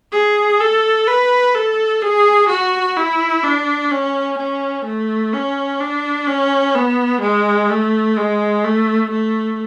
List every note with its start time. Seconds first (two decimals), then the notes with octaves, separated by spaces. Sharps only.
0.12 G#4
0.60 A4
1.07 B4
1.54 A4
2.02 G#4
2.49 F#4
2.96 E4
3.43 D4
3.91 C#4
4.38 C#4
4.85 A3
5.33 C#4
5.80 D4
6.27 C#4
6.75 B3
7.21 G#3
7.70 A3
8.16 G#3
8.64 A3
9.11 A3